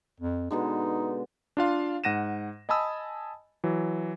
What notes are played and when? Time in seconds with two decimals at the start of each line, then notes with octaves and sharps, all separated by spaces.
0.20 F2
0.51 B2 D3 G#3 D#4
1.57 D4 F4 F5 C6
2.04 G#2 F#5 A#6 D#7 E7
2.69 D#5 G#5 A5 B5 D#6 E6
3.64 E3 F#3